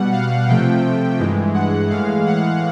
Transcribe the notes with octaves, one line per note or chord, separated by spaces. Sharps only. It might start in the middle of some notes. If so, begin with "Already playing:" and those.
Already playing: B2 G3 F#5
F5
C3 F3 A3 G5
G2 E3 G#3
F#5
A2 E3 G#3 F5
F#5